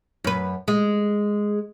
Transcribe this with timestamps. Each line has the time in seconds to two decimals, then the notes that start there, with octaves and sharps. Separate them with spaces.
0.24 F#2 B4
0.68 G#3